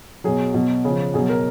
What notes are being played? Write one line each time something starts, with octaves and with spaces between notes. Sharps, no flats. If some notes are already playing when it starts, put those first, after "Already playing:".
B2 F#3 G#4
B2 F#3
C#3 F3 G#4
B2 F#3 G#4
A#4